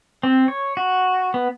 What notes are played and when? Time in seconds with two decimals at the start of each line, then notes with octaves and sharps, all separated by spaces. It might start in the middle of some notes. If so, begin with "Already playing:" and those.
0.23 C4
0.48 C#5
0.77 F#4
1.34 B3